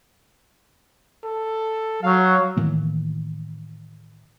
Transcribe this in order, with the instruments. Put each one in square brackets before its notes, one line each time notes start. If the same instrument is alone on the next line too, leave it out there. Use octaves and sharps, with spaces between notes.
[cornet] A4
[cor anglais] F#3 [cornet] F5
[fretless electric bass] A2 D#3 E3 A#3